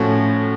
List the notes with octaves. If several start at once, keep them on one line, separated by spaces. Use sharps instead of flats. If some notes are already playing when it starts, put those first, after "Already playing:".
Already playing: A2 F3 A3 C#4 F#4